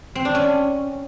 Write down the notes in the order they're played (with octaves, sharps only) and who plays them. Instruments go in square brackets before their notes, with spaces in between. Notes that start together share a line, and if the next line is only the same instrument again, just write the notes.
[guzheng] C4
D4
C#4